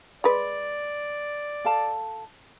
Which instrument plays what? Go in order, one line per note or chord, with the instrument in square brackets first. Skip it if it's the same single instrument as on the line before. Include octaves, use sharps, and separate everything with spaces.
[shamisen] G#3 B4 [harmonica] D5
[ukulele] A4 F5 A5